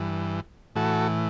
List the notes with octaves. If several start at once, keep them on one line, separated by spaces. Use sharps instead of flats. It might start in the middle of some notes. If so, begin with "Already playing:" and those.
Already playing: G2 E3
A2 E3 F#4 A4